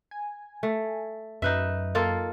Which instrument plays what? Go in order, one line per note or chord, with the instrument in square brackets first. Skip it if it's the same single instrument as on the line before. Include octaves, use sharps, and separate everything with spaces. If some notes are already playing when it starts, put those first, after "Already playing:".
[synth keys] G#5
[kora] A3
[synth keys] F#2 [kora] D#4 B4 E5
[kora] A#3 F4 A4